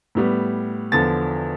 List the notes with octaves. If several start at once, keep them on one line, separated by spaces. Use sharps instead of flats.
A2 G3 B3
E2 D3 F3 A6